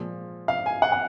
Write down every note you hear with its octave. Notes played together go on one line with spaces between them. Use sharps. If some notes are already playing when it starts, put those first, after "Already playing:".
Already playing: A#2 F3 G#3
F5
G#5
F#5
F#5